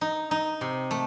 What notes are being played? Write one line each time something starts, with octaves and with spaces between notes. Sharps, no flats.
D#4
D#4
C3
A3